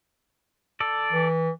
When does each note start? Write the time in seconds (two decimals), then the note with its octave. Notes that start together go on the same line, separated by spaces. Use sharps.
0.80 A4 D5
1.13 E3